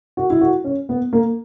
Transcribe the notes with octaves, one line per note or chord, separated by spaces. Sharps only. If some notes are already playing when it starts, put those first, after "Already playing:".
F#4
E4
F#4
C#4
B3
A#3